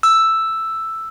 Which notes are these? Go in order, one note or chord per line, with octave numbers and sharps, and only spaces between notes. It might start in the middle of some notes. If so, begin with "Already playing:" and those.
E6